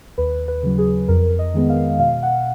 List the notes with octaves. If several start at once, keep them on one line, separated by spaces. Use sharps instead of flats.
D#2 B4
B4
C#3 F#3
G#4
F2 A#4
D#5
D#3 G#3 B3
F5
B2 F5
F#5